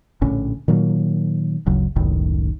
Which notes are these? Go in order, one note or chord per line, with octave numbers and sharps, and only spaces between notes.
A#1 A2 D3 C#4
A#2 D#3 F#3 A#3
G1 D2 C#3 F#3
F#1 C#2 A2 D#3